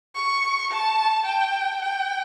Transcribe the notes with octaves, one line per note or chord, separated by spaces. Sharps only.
C#6
A5
G5
G5